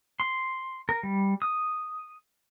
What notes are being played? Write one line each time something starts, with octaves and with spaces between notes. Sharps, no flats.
C6
A#4
G3
D#6